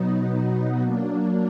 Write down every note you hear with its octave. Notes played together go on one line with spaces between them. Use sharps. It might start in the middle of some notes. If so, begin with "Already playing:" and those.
Already playing: B2 F#3 B3 D#4
F#3 A#3 D4